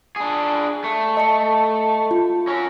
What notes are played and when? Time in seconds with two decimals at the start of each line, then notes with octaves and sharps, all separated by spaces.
0.16 D4 G#4
0.84 A3
1.17 D#5 A5 C#7
2.11 F4
2.47 C#4 A#4